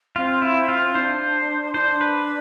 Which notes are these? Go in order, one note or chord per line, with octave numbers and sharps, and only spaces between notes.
C4 F4
E4
F4
D4 E4 C5
D4 E4 C5
B4